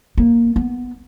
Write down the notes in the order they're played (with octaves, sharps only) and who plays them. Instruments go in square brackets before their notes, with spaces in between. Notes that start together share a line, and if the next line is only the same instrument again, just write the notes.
[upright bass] A#3
B3